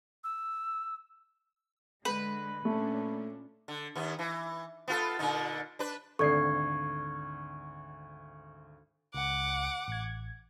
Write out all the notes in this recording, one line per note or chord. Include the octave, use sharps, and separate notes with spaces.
E6
D3 G#3 B4
A#2 A3 C#4 D4
D3
D#2 B3
E3
B3 F4 A4
A#2 D3 D#4
D4 B4
G#1 D2 A4 D5 C#6 G#6 C7
C#2 F#5 D6
A1 G#6